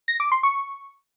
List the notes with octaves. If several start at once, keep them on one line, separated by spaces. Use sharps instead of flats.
A#6
D6
C6
C#6